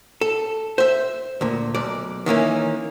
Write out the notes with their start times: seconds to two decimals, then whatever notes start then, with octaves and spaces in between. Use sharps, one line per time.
0.21 A4
0.78 C5 E5
1.41 D2 A#2
1.75 B1 D5
2.26 D#3 E3 A#3 C#4